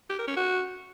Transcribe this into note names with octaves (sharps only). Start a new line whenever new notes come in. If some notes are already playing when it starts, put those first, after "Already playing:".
G4
A#4
C#4
F#4